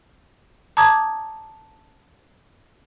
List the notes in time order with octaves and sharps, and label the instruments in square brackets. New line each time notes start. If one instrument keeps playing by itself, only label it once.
[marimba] A5 A#5 D6 D#6 G#6